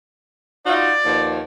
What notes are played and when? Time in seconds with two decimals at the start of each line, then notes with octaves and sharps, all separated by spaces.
0.66 D#4 F4 F#4 D5
1.06 D#2 B2 F3